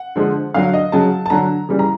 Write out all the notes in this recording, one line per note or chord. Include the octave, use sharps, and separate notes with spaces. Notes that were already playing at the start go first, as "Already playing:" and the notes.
Already playing: F#5
D3 F3 G#3
D3 F#3 F5
D#5
C#3 F#3 A5
A5
D3 F#3 A#5
C#3 E3 G3
A#5